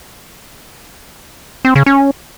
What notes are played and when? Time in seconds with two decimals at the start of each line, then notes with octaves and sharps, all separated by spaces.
1.65 C4
1.76 C#3
1.86 C#4